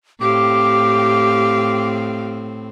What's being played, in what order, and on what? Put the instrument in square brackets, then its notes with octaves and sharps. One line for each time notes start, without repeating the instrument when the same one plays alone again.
[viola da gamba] A2 C4 [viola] G4 F5 [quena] D6